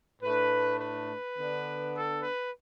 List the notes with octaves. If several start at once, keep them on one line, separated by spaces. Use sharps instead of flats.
A2 A3 D4 B4
B4
D3 B3 D4
A4
B4